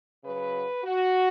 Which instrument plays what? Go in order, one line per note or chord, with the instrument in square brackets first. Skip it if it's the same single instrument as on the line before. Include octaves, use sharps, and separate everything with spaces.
[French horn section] C#3 F#3 B4
F#4